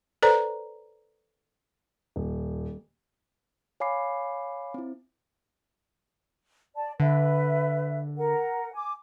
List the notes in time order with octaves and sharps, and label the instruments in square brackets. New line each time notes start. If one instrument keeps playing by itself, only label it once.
[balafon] A4 B4 C5 D5 A#5
[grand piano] D#1
[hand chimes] C#5 F5 G#5 B5 D6 C7
C4 E4
[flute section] D5 A5
[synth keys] D3 [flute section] B4 E5
[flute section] A#4 F#5
G#5 D6